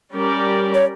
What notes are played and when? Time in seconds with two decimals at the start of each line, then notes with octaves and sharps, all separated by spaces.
0.12 G3 C#4 G4 A#4 D5
0.74 C#5